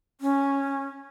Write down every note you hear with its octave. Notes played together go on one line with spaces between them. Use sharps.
C#4